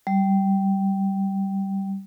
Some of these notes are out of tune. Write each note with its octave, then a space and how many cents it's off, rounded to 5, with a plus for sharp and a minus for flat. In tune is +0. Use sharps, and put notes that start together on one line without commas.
G3 -10